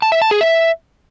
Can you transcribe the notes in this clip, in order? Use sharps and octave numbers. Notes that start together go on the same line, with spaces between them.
A5
E5
A5
G#4
E5